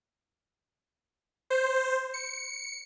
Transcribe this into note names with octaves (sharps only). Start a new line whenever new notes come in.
C5
C#7